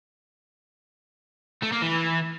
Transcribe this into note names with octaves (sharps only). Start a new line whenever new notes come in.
A3
A#3
E3